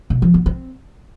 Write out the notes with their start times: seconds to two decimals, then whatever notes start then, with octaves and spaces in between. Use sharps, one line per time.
0.10 B2
0.22 F3
0.34 B3
0.46 C4